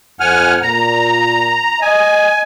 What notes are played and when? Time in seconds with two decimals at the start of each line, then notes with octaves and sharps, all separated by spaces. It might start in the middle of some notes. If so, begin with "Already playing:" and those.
0.20 F2 F#5 G#5 F6
0.62 A#2 A#5
1.82 D#5 G#5